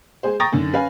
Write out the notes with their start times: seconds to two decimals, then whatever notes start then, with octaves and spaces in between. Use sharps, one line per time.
0.23 G#3 G#4 C5
0.40 G5 A#5 C#6 D#6 A6 A#6
0.52 F#2 D3 D#3
0.72 C#4 B4 F5 G#5